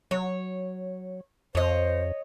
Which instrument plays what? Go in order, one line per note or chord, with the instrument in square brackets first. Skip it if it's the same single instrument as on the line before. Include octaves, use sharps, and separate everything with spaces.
[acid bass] F#3 [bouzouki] C#5
[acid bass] F2 [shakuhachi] C5 [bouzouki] C#5 D#5